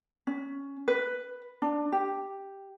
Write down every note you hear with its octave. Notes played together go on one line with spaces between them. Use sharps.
C#4
B4
D4
G4